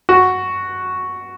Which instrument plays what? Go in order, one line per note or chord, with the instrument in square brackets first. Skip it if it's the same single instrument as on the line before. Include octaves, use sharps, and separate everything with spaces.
[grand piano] F#4